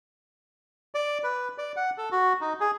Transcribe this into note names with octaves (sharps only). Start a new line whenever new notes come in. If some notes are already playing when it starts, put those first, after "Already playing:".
D5
B4
D5
F#5
A4
F#4
D#4
G#4